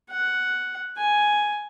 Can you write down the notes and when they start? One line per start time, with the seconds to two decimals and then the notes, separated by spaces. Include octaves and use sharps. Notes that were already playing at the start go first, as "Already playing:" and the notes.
0.10 F#5
0.98 G#5